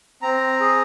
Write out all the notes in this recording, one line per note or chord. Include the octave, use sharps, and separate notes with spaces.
C4 A#5
G#4